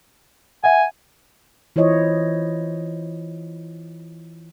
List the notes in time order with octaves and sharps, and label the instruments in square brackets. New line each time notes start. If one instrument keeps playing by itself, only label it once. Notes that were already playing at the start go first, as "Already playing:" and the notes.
[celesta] E5 F#5 [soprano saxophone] G#5
[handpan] E3 E4 F4 C5 C#5 D#5